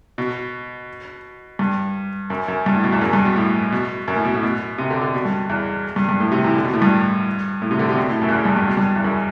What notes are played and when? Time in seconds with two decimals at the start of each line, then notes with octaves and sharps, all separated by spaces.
0.18 B2
1.59 G2
2.30 F#2
2.48 F#2
2.66 G2
2.74 A2
2.84 B2
2.92 E2
3.02 F#2
3.13 G2
3.25 B2
3.36 A2
3.72 B2
4.08 F#2
4.16 A2
4.25 B2
4.34 A2
4.43 B2
4.78 C3
4.90 D3
5.01 D3
5.14 B2
5.25 G2
5.49 E2
5.96 G2
6.09 G2
6.20 A2
6.32 C3
6.44 E3
6.55 D3
6.64 B2
6.73 A2
6.82 G2
7.62 A2
7.71 C3
7.79 D3
7.89 C3
7.98 B2
8.09 A2
8.21 F#2
8.28 E2
8.33 F#2
8.45 G2
8.56 G2
8.68 B2
8.77 G2
8.96 E2
9.04 F#2